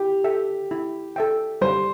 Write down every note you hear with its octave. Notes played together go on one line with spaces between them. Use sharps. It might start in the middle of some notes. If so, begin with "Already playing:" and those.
Already playing: E4 G4
A4 E5 G5
E4
A4 E5 G5
G3 C5